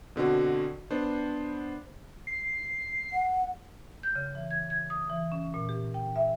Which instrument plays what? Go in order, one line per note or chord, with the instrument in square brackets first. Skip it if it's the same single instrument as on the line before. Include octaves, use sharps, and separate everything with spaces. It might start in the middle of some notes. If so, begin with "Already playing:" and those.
[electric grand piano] B2 D3 C4 F#4
B3 D4 C5
[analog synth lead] C7
[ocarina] F#5
[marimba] G6
C#3
E3
G#6
G#6
D#6
E3
C#4
A#2
G4
G5
E5